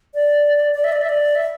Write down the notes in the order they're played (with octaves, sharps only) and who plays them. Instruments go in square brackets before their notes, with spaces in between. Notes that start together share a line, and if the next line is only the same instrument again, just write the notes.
[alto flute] D5
D5
E5
D5
E5
D5
E5